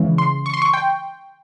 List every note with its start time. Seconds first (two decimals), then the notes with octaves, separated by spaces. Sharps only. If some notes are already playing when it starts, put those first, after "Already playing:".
Already playing: C#3 E3 G#3
0.18 C6
0.46 C#6
0.54 C6
0.62 C#6
0.74 G5